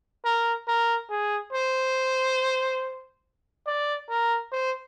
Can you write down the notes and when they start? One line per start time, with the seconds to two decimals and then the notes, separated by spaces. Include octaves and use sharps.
0.24 A#4
0.68 A#4
1.09 G#4
1.53 C5
3.67 D5
4.09 A#4
4.52 C5